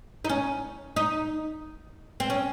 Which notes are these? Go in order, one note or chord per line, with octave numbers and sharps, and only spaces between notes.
D#4
C#4
D#4
C4
C#4